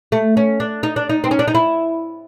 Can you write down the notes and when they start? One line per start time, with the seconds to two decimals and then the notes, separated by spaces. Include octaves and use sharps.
0.12 A3
0.37 C#4
0.60 D4
0.83 D#4
0.96 D4
1.09 D#4
1.24 C4
1.31 C#4
1.39 D4
1.48 D#4
1.55 E4